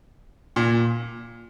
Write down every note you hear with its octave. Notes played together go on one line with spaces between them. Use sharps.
A#2